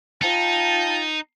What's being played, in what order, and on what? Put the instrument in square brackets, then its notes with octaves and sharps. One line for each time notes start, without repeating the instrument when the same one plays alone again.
[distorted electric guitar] D#4 [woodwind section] F4 G5 A5